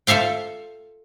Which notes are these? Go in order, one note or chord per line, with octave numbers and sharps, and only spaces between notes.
F4 A4 E5 F5 G5